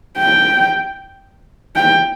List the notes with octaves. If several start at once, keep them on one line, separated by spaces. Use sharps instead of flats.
G5
G5